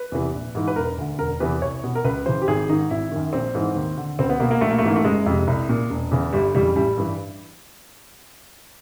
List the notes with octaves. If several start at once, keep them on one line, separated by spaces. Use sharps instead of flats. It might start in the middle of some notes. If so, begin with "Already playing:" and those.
Already playing: B4
E2 C3 E3
A#1
G#2 E3
B4
E1 A#4
D2 D3
E1 A#4
E2 C3 E3 B4
C2 C#5
B2
A#4
C#2 B4
C#3 E3 C5
G4
G#1 G#4
G#2 D#3 D#4
G#1 E4
F#2 D#3
A#1 C4
G#2 E3
D#2
D3
C#2 C4
B3
B2 A#3
A#3
A#1 A3
A#3
A3
G#2 E3 A#3
A3
F#1 G#3
F2 C3
C2
A#2
E1
E2 C#3 E3
G1 G3
F2 C#3 E3 G3
A1 G3
G2 E3